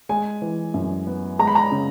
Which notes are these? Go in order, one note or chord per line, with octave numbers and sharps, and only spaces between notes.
G#3 G#5
E3
F#2
B3
G#3 A#5
B5
A#5
C#3